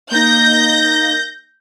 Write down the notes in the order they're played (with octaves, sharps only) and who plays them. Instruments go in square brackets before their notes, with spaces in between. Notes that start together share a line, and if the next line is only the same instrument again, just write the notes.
[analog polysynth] A#3 D#4 [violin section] G6 A#6